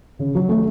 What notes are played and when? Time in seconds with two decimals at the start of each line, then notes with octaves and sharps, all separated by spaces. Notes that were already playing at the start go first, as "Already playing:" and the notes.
0.19 C#3
0.35 F#3
0.49 A3